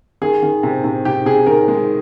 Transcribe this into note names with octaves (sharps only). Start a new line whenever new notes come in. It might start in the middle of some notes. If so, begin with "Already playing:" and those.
D#3 G#4
D#3
C3
C3
C3 G4
C3 G#4
D#3 A#4
G#3